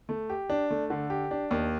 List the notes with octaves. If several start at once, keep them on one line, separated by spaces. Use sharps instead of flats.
A3
G4
D4
A3
D3
G4
D4
D#2